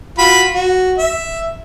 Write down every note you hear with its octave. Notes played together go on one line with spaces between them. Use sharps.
F4 F#4 B5
F#4
E5